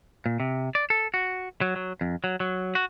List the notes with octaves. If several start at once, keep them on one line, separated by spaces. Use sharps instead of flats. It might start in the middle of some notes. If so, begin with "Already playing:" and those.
A#2
C3
D5
A4
F#4
F#3
F#3
F2
F#3
F#3
F#4